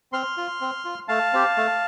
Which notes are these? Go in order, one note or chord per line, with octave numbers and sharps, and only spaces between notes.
C4 C6 F6
F4
C4
F4
A3 F5 A5
C4 G4
A3